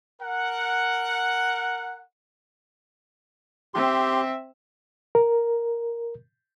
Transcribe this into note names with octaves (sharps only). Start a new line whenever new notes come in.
A#4 F#5
C4 G4 E5 C6
A#4